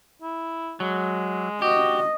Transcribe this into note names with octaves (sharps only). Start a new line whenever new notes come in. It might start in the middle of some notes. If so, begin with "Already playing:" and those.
E4
F#3 G#3
F#4 G4 D#5